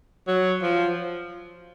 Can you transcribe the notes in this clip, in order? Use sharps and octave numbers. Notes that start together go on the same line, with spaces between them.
F#3
F3